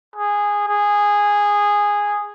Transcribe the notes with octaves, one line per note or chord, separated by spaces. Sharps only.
G#4
G#4